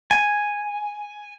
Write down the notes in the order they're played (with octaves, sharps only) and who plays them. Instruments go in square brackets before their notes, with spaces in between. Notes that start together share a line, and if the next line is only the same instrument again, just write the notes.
[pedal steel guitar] G#5